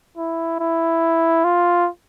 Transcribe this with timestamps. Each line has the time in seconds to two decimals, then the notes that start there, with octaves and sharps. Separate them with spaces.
0.17 E4
0.60 E4
1.44 F4